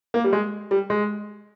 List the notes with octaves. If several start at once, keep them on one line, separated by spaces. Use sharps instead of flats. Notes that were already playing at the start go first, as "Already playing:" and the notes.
A#3
G3
G#3
G3
G#3